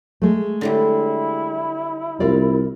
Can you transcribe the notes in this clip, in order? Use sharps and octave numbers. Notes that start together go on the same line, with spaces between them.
G#3 A3
D3 F#3 G3 E4
C2 F4 A#4 D5